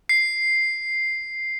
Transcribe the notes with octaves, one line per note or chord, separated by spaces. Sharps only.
C7